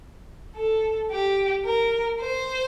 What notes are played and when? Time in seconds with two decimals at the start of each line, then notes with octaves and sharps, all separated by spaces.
0.55 A4
1.10 G4
1.65 A#4
2.21 C5